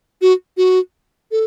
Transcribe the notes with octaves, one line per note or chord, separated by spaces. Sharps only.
F#4
F#4
A4